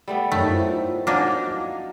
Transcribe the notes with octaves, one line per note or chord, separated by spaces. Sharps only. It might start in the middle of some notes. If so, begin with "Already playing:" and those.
G3 A3 B3
F#2 D#3 A3 C#5
E4 F4 C5
F3 F#3 A#3 D4 D#4 G#5